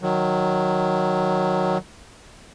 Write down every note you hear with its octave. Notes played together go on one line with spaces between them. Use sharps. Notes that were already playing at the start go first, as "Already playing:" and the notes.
D#3 F#3